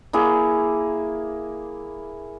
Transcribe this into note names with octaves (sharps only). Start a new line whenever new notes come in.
A#3 E4 G#4